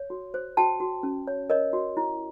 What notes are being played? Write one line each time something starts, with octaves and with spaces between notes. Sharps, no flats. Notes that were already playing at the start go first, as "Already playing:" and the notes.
Already playing: C#5
F#4
C5
F#4 G5 A5
F#4
C#4
C#5
A#4 C#5 D#5
F#4
E4